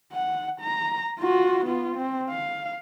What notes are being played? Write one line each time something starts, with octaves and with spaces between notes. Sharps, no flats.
F#5
A#5
F4 F#4
B3 F4
C4
F5